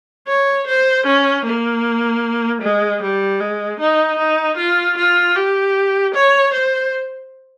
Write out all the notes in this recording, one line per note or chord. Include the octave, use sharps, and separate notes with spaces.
C#5
C5
C#4
A#3
G#3
G3
G#3
D#4
D#4
F4
F4
G4
C#5
C5